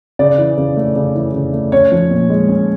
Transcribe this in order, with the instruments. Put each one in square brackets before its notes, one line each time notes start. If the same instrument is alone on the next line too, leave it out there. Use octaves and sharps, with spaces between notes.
[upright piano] C#3 D5
E3
C#3
A3
C#3
E3
C#3
A3
C#4 C#5
F3
A#2
G#3
C#4